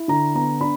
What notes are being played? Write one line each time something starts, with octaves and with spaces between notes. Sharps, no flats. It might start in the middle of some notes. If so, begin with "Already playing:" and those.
Already playing: E4
D3 A#5
B3 A#5
D4 B5